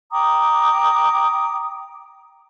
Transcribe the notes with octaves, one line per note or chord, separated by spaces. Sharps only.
G5 A#5 D6 D#6